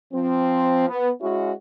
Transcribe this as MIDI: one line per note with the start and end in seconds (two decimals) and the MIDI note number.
0.13 0.87 53
0.13 0.87 60
0.89 1.09 59
1.22 1.52 56
1.22 1.52 61
1.22 1.52 64
1.22 1.52 66